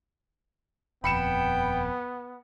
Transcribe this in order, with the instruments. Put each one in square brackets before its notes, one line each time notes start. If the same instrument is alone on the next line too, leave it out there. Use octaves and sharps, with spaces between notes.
[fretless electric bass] D#1 F2 [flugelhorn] B3 [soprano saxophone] G5 [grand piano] B5 C#7 E7